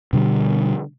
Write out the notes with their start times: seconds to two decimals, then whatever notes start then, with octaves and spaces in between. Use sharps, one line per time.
0.13 B2 D3 G3